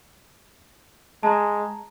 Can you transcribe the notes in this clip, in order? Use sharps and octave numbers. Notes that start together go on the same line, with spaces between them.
G#3 A5 A#5